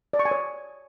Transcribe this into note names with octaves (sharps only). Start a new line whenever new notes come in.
D5
C#6
G#5
C#5